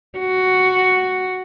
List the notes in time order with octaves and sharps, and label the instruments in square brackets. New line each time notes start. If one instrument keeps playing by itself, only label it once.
[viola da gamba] F#4